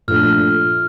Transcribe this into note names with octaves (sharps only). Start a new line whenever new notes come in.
A#2 F3 A3 D4 F4 F6